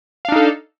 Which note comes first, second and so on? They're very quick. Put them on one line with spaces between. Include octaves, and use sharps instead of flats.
F5 D4 D#4 A4